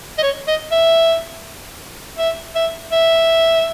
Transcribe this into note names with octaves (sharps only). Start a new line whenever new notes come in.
D#5
C#5
D#5
E5
E5
E5
E5